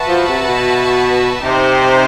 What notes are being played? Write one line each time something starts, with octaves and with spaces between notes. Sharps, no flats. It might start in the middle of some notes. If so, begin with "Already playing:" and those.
Already playing: F#4 B4 E5 A5
F3
C3
B2
C3 D#4 G4 C5